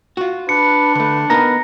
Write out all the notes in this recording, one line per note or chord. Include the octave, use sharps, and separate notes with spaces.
F4 F#4
D4 B4 C#7
D3 A3 B4
B3 D#4 A#4 B4 A#5 A#6